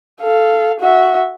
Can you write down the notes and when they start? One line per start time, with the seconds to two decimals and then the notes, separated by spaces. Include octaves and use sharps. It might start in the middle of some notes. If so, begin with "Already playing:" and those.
0.21 A4 F5
0.80 F#4 E5